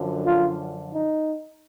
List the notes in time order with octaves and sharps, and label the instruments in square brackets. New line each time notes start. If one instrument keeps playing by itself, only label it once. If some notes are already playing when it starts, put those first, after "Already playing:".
Already playing: [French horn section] F#2 D3 F3
[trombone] F4
D#4